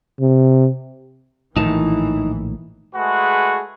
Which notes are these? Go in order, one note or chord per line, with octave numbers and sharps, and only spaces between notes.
C3
A#1 A2 D#3 E3 D#4 A5
G#3 A3 F#4 G#4 B4 F#5